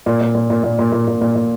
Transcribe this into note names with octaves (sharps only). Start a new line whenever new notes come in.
A#2
A#2
A#2
A#2
A#2
A#2
A#2
A#2
A#2
A#2